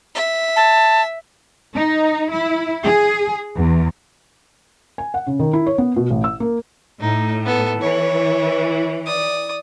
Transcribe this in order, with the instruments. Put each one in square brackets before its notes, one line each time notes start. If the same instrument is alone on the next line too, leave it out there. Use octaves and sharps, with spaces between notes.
[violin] E5
[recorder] A5
[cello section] D#4
E4
G#4
E2
[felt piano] G#5
F#5
C#3
D#3
E4
C#5
B3
B2
A1
E6
A#3
[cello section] A2 [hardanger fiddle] D#4
[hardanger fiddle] B3 A4
[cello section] E3 [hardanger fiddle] C#5
[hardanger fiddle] D5 D#6